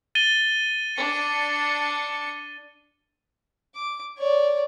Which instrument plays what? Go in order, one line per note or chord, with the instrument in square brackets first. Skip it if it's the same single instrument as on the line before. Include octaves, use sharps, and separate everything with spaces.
[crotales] A6 D#7 G7
[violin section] D4 C#7
[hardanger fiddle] D6
C#5 D5